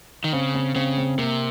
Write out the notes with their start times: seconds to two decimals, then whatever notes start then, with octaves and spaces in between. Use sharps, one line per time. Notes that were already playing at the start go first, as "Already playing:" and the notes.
0.24 D#3
0.33 C#3 C4
0.54 C4
0.75 C#3 C4
0.98 C4
1.18 C3 A#3